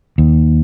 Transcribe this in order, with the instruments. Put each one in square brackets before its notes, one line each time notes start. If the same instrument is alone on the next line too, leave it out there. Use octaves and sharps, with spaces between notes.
[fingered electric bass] D#2